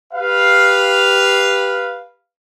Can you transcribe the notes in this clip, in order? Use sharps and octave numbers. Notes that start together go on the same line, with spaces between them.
G4 B4 F5